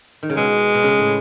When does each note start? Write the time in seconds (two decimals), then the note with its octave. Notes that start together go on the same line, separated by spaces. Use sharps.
0.23 D#3
0.30 C#3
0.37 B2 G#3
0.74 B2
0.83 C#3
0.98 A2